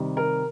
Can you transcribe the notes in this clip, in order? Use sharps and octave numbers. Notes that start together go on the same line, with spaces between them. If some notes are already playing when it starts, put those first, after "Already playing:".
Already playing: C3 D#3 G3
A#4